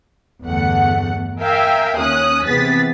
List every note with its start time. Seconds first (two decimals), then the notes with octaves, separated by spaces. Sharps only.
0.44 G1 E2 A3 F#5
1.39 A#4 E5 F5 G5 G#5
1.98 D#2 C#4 D#6 F#6
2.45 C3 E3 B3 G#4 A6 B6